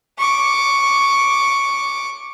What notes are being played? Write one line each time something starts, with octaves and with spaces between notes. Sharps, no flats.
C#6 D6